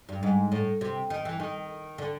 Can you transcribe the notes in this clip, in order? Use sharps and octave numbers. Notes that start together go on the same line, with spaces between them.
G2
G#2
A2
C3
D#3
E3
D#3
D3